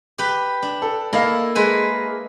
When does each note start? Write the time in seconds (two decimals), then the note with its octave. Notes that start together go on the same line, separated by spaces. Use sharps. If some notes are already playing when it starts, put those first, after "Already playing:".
0.18 G4 B4
0.62 D4
0.82 A4
1.13 A#3 E4 A4 A#4 D#5 F5
1.55 G#3 B4 G#5